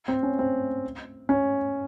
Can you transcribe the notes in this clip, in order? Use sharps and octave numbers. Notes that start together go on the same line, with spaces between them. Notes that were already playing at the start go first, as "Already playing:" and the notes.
C4
C#4
C4
C#4